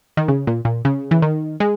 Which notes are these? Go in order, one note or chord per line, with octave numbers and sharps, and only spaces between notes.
D#3
C#3
A#2
A#2
C#3
E3
D#3
G#3